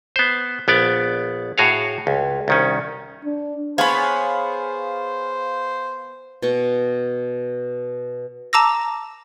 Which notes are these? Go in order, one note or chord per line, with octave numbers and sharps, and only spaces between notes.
B3 C5
A#1 B3 D5
A2 F#4 G#4 C#5 F5
C#2
C2 D#3 C#4
D4
B3 G#4 C5 C#5 F5 B5
B2 G5 C#6
A5 A#5 D6 E6 A#6